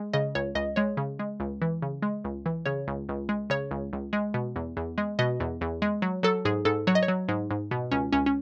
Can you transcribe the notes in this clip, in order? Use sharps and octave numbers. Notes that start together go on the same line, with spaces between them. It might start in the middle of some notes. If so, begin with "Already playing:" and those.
Already playing: G#3
C#3 D#5
C#2 C#5
C#2 D#5
G#3 C#5
C#3
G#3
C#2
E3
C#3
G#3
C#2
E3
C#3 C#5
C#2
C#2
G#3
C#3 C#5
C#2
C#2
G#3
B2
E2
E2
G#3
B2 D#5
E2
E2
G#3
F#3
F#3 A4
G#2 G#4
G#2 A4
F#3 C#5
D#5
C#5
F#3
G#2
G#2
B2
C#2 C#4
C#2 C#4
C#4